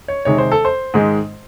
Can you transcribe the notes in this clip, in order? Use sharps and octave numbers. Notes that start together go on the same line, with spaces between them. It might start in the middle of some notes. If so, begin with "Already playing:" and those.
C#5
C3 D#3 G#3 C#5
C5
A4
C5
G#2 D#3 G#3